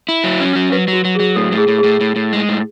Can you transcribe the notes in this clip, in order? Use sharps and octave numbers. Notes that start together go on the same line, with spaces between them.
E4
F#3
C#4
F#3
F#3 B4
F#3
F#4
F#3
F#3 G#4
A2 A4
A2
G#4
A2
G#4
A2
A2
A2
G#3
A2